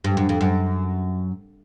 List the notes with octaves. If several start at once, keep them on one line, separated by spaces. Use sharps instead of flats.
G2
F#2
F2
F#2